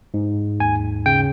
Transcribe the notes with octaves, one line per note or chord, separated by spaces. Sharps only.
G#2
D#2 G#5
C#3 G5